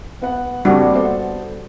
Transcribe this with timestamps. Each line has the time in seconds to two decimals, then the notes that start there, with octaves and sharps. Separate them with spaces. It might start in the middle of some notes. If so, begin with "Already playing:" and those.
0.22 B3 B4 F#5
0.65 F2 G3 A#3 C4 D4 F#4
0.95 B3 A4 C5